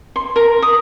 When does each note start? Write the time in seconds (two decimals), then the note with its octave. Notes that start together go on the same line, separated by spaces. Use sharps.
0.16 C6
0.36 A#4
0.62 D#6